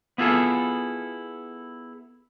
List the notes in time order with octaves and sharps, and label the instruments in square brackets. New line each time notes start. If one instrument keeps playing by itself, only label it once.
[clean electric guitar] B3 E4 F4 G#4 A4